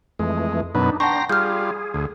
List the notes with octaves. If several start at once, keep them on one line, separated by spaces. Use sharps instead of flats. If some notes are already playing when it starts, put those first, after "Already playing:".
F2 E3 G#3 A3
F#2 B2 D4 D#4 B4
D4 F#5 G5 A5 A#5 C6 C#6 A#6
G3 F4 G#4 F6 G6
D2